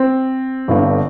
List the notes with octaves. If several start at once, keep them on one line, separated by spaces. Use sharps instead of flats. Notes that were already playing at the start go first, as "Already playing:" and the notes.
Already playing: C4
G1 G2 D3